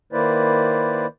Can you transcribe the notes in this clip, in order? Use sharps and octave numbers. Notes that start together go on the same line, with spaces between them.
D#3 A#3 E4 B4 C5 D5